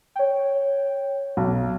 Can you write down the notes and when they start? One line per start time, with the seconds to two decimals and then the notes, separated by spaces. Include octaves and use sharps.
0.16 C#5 G5
1.37 B1